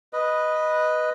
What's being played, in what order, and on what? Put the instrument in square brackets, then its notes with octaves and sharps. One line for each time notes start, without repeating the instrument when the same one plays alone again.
[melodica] B4 D#5